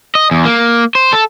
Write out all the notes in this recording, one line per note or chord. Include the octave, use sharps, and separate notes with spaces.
D#5
E2
A#3
C5
A4